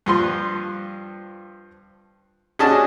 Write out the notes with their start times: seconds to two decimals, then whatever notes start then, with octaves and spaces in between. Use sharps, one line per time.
0.06 G2 F3 C6
2.59 C#4 D4 F#4 G#4 D#5 A5